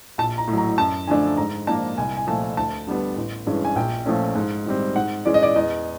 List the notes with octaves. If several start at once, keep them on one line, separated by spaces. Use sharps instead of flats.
A#1 A5
A#5
A2
F#3 A#5
F#2 A5
D3 F3 A3 D4 G#5
G#2 A#5
F3 A#3 D4 A5
C2 G#5
G#5
A#2 F3 A3 A5
D2 A5
D3 G3 B3
A1
G2 E3 G#3 C#4
G#5
A#1 G5
A#2 F3 A3 C#4
G#2
D#3 G3 C4
G#2 F#5
E3 G#3 C#4 D5
D#5
D5
E2 D#5